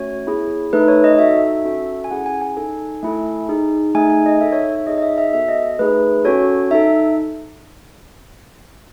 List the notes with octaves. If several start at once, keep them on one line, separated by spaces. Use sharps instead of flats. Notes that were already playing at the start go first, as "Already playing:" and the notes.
Already playing: A3 C#4 F#4 C#5
B3 E4 G#4
A3 D#4 A4 B4
C#5
D#5
D#4 F#4 A4 E5
C#4 F#4 A4
G#5
C#4 E4 G#4 F#5
G#5
G#5
D#4 A4 G#5
A3 E4 A4
D#4 G#4
A3 D#4 G#4 G#5
G#5
D#5
D#4 A4 E5
C#5
E5
C#5
D#4 G#4 D#5
D#5
E5
E5
B3 F#4 A4 E5
D#5
A3 D#4 G#4 B4
C#4 F#4 A4 C#5
D#4 A4 E5